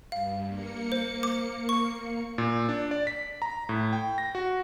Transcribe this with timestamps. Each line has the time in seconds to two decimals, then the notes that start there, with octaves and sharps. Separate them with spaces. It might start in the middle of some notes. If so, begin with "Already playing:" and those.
0.12 G2 F5
0.48 A#3 C#7
0.92 C5
1.23 D6
1.69 C#6
2.38 A#2
2.69 D4
2.91 D5
3.07 B6
3.42 A#5
3.69 A2
3.93 G5
4.18 A#6
4.35 F#4